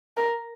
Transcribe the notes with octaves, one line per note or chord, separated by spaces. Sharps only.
A#4